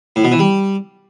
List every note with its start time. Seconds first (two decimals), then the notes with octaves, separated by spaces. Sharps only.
0.16 A2
0.24 B2
0.32 E3
0.39 G3